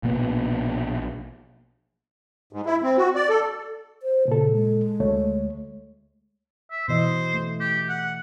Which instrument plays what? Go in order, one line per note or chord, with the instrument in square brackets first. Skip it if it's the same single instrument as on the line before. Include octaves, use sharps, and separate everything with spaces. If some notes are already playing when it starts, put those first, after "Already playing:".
[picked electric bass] A#1 B2 A#3 B3
[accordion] G#2
E4
C4
F#4
D5
A4
[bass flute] C5
[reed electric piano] A#2 A4 [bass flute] C#3
[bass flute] G#3
[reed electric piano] D2 A3 C#5
[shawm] E5
[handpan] B2 E3 D#5 [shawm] C5
[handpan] A3
[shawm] G4
F#5